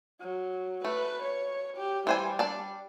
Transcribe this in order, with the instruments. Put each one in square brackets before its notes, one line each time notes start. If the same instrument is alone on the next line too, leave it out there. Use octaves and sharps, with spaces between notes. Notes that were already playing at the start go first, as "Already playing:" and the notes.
[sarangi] F#3
[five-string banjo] A3 [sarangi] B4
[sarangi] C#5
G4
[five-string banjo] E3 C5 G#5 [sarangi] G3
[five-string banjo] D4 D5 A5